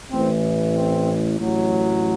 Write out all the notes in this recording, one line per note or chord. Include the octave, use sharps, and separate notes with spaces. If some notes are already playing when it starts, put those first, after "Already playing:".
A1 A2 E3 C4
C4
A1 A2 F#3